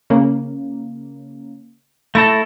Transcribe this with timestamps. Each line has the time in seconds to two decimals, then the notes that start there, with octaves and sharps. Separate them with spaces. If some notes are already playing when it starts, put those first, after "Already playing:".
0.10 C#3 A#3
2.15 A3 E4 A4 A#6